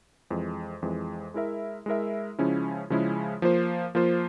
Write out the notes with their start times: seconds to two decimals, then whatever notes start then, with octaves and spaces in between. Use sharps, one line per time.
0.30 F2 E3 G#3
0.82 F2 E3 G#3
1.34 G#3 E4 A#4 E5
1.86 G#3 E4 A#4 E5
2.39 C#3 F3 G#3 C#4 E4
2.90 C#3 F3 G#3 C#4 E4
3.42 F3 A#3 F4 C5
3.95 F3 A#3 F4 C5